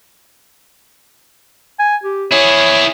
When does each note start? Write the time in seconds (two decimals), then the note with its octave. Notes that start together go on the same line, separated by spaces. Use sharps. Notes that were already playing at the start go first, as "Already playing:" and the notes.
1.79 G#5
2.04 G4
2.31 E4 G#4 C#5